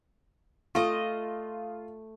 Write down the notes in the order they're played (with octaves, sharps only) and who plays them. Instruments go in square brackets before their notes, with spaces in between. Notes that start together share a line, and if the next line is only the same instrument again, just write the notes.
[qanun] A3 D#5 [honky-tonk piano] F4